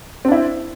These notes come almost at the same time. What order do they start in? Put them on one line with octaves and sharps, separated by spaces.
C4 D4 E4